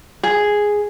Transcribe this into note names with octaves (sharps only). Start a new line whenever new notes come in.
G#4